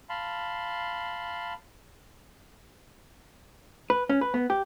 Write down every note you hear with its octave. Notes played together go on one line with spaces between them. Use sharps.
F5 A5 B5 C6
B4
C#4
B4
B3
G4